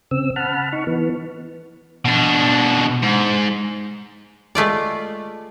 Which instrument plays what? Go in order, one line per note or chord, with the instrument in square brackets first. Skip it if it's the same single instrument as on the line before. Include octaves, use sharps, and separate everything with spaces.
[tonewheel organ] C#3 C4 E6
F#5 A5 B5 F6
D#4 C#6
E3 B3
[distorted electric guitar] B2 D4
G#2
[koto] G#3 A3 F4 D5